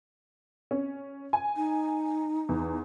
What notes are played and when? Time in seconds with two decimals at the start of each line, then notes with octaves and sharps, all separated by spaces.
0.71 C#4
1.33 G#5
1.56 D#4
2.49 E2